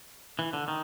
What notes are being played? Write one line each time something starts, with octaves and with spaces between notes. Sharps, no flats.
E3
D3
D#3